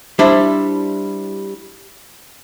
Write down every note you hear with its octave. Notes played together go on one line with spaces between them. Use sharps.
G3 D4 E4 C5